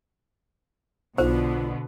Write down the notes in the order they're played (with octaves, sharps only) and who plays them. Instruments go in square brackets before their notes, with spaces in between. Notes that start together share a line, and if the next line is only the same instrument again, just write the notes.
[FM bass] B1 [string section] B2 D3 B3 [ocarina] F4 [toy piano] C5